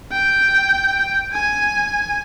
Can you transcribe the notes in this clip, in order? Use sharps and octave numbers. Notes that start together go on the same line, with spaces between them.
G5
G#5